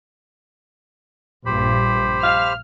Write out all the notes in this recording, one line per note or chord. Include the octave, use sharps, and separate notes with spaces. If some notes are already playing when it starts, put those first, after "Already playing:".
A#1 G2 G4 C5 B5
F5 F6